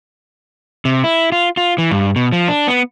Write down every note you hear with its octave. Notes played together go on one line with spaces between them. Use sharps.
C3
E4
F4
F4
E3
G2
B2
F3
D4
B3